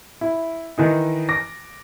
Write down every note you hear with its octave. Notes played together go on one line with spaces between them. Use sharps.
E4
D#3 E3 D#4
D6 A#6